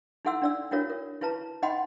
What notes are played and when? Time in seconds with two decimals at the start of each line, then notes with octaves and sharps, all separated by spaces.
0.25 D#4 E4 A4 F#5 C6 E6
0.42 D4 D5 E6
0.71 D4 E4 F#4 A#4 C#5
0.90 A#4
1.21 E4 F4 B4 A5 A#5
1.62 D#4 D#5 F#5 G5 B5 C6